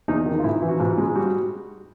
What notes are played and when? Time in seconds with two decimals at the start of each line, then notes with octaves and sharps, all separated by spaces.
0.08 E2 D#4
0.26 D#3
0.39 F4
0.44 G#2 E4
0.62 E3
0.69 F#4
0.80 G#2 F4
0.98 G#3
1.15 G3 F#4